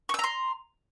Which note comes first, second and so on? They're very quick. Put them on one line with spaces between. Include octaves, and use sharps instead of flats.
C#6 E6 A#5 C6